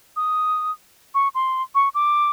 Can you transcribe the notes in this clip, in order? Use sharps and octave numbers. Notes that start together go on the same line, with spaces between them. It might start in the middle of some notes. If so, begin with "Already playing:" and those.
D#6
C#6
C6
C#6
D6